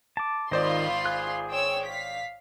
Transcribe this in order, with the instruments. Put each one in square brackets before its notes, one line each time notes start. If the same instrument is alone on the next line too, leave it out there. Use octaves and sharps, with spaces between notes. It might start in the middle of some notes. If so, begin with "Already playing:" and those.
[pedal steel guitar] A5 D6
[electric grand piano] G#1 C5 D5 [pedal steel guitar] D#3 D#5 [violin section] F4 B5 C6
[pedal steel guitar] G#4 F#6
[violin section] C#5 G5 E6
F5 B6